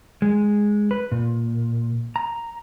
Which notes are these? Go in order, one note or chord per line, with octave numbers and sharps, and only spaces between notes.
G#3
B4
A#2
A#5